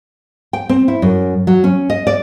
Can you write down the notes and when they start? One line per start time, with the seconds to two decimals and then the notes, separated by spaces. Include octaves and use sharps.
0.53 G5
0.69 C4
0.88 E4
1.02 F#2
1.47 F#3
1.64 C#4
1.90 D#5
2.07 D5